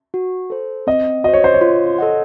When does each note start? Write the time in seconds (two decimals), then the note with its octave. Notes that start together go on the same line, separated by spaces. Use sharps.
0.14 F#4
0.50 A4 C5
0.87 C4 D#5
1.24 F#4 C5 D#5
1.34 C#5
1.44 C5
1.54 C#5
1.61 F4
1.98 A4 D#5 F#5